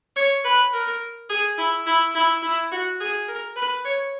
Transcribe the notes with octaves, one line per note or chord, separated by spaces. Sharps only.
C#5
B4
A#4
G#4
E4
E4
E4
E4
F#4
G#4
A#4
B4
C#5